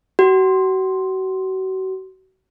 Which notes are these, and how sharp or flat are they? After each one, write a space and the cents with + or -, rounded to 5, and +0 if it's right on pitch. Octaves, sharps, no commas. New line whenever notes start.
F#4 +35